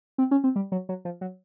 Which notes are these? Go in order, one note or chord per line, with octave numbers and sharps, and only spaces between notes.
C4
C#4
C4
G3
F#3
F#3
F3
F#3